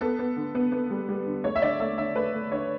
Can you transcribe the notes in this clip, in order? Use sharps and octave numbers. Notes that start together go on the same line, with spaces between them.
B3 A4
B3
D3
B3
B3
G3
G3
D3
A3 C#5
E5
D3 D5
A3 E5
D3 E5
A3 B4
A3
D3 C#5